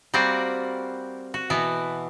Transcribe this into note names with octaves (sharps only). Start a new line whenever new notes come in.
G3 A#3 C4 F#4
F#4
B2 E3 B3